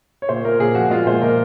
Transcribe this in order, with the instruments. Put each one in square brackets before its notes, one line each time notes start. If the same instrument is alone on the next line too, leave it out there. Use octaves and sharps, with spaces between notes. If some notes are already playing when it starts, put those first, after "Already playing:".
[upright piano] C#5
A#2 C5
A#2 A#4
A#2 G#4
F3 F#4
G#3 F4
A#2 C5
A#2 A#4